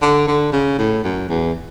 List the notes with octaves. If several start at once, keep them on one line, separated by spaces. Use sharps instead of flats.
D3
D3
C#3
A2
F#2
E2